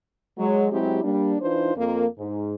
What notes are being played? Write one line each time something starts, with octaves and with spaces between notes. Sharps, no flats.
F#3 G#3
F#3 G#3 C4 E4 G4
G3 A#3 D4
E3 D4 D#4 F4 B4 C5
F2 A#3
G#2